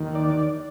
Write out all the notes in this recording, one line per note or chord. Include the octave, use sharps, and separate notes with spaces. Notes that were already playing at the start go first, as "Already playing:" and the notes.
Already playing: D#2 D#3
D5